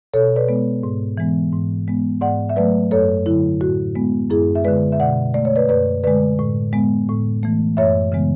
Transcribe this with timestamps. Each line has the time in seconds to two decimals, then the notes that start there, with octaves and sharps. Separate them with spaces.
0.14 B2 A4 C#5
0.36 B4 D5
0.48 G#3 B3
0.83 G#2
1.18 E3 G#3 B3
1.53 G#2
1.88 G#3 B3
2.22 G#2 D5 F#5
2.49 E5
2.56 F#3 A3 B4 D5
2.91 F#2 A4 C#5
3.26 D3 F#3 E4
3.61 A2 F#4
3.95 G#3 B3
4.30 F#2 E4 G#4
4.55 E5
4.65 D3 G#3 B4 D5
4.92 E5
5.00 B2 D5 F#5
5.34 A3 D5
5.45 C#5
5.56 B4 D5
5.69 F#2 B4 D5
6.04 D3 G#3 B4 D5
6.39 A2
6.73 G#3 B3
7.09 A2
7.43 E3 A3
7.77 F#2 C#5 E5
8.12 C#3 E3 G#3 B3